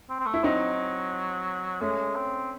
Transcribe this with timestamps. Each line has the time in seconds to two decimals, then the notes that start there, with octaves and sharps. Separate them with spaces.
0.09 C4
0.20 C4
0.26 A3
0.34 E4
0.43 F#3 C4 D#4
1.81 G#3 A3 C#4
2.16 C4